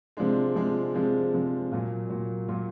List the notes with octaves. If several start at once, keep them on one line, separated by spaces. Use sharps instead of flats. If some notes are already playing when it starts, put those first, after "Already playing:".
C3 F3 G#3 D4
C3 F3 G#3
C3 F3 G#3
C3 F3 G#3
A#2 F#3 F4
A#2 F#3
A#2 F#3 F4